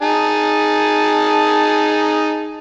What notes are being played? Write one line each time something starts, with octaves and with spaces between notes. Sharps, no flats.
D#4 G#4 A5